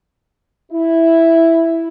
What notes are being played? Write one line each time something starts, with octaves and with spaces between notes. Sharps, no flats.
E4